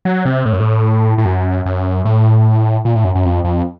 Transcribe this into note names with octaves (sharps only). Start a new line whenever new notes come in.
F#3
C3
A2
F#2
A2
A2
F#2
F#2
A2
A#2
A2
F#2
F#2
F2
F2